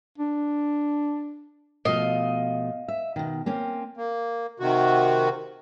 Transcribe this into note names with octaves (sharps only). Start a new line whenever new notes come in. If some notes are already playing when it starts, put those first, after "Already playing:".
D4
B2 F3 A3 D#5 F5
E5
B2 D#3
A#3 C4 C#4
A#3
C3 D#3 F#4